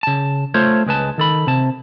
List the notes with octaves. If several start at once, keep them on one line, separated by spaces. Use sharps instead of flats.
C#3 A5
A3 F4 C5 C#5
C#2 G#3 B4 A5
D#3 A4 B5
C3 A5